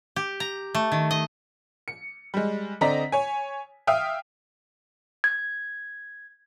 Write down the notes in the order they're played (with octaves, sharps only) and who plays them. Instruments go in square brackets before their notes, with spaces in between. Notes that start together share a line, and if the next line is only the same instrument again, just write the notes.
[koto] G4
A#5
A3
D#3
D#5
[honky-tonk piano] C#7
G3 G#3
D3 C4 D5 D#5 A#5 B6
C#5 G#5
E5 F5 G5 D#6 F6
[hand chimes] G#6